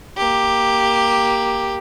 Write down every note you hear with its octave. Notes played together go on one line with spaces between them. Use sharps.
A#3 G4